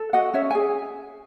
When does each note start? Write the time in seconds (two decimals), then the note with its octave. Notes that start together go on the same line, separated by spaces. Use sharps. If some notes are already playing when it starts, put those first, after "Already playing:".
Already playing: A4
0.13 F#4 D#5 F#5
0.34 C#4 C#5 E5
0.50 G#5
0.55 G#4